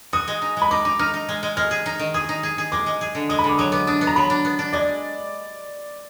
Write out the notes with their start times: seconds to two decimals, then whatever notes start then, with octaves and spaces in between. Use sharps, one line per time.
0.13 F#4 D#6
0.28 G#3
0.42 D#4
0.57 G#3 B5
0.71 D#4 D6
0.85 D#4 D6
0.99 D#4 F6
1.14 D#4
1.29 G#3
1.43 G#3
1.57 G#3 F6
1.71 G#4
1.86 D#4
1.99 D#3
2.14 G#4 D#6
2.29 D#4
2.43 G#4
2.58 G#4
2.72 G#3 D6
2.86 G#3
3.01 G#4
3.15 D3
3.29 G#3 D#6
3.39 B5
3.44 D3
3.49 D6
3.58 F#3 D#6
3.72 B3 D6
3.87 D4 D#6
4.01 B3
4.07 A#5
4.16 F#3 B5
4.30 D4
4.45 B3
4.59 D4
4.73 G#3 D5